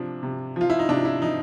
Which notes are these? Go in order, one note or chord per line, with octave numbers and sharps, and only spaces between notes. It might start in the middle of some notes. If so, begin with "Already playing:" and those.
Already playing: C3 F3 D4
C3
F3 F4
E4
D#4
C3 D4
E4
F3 D#4